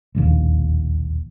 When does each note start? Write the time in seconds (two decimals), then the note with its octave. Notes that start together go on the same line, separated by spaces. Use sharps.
0.15 E1 A#1 D#2